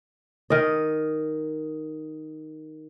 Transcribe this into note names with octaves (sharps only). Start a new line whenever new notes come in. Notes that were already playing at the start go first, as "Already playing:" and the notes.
D#3 D#5